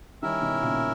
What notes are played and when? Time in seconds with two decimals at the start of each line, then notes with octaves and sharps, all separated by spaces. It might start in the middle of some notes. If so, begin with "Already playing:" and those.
0.22 D#3 G3 C#4 E4 A#4 E5
0.41 B2 D#3
0.62 A#2 C#3